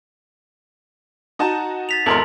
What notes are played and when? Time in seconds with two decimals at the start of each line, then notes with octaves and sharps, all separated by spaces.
1.39 D#4 F#4 A5
1.89 A6 B6 F7
2.06 G#1 E2 A4 A#4 C6 F#7